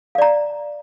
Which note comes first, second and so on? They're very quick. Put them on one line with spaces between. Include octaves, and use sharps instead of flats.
F5 D5 A#5